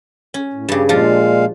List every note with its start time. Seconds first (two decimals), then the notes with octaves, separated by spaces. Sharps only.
0.34 C#4
0.53 A2
0.69 G2 C#3 G4
0.89 A#2 F3 G#3 D4 F5